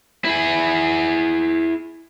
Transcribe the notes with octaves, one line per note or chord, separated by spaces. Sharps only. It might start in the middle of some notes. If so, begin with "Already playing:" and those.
E4 G#4